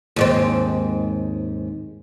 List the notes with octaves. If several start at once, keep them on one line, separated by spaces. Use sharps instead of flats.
D#2 G#2 C4